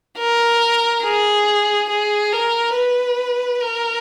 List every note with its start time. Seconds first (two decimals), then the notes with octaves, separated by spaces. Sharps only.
0.18 A#4
1.03 G#4
1.90 G#4
2.33 A#4
2.75 B4
3.61 A#4